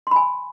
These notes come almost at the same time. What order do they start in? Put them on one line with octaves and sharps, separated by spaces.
C6 B5 G#5